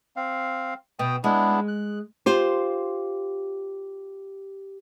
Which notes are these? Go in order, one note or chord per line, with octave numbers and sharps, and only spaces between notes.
C4 F5
B2 G5 D#6
G#3 B3 D4 E4
F#6
F4 G4 C5